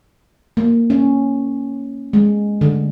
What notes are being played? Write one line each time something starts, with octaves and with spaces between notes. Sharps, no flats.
A#3
C#4
G#3
D3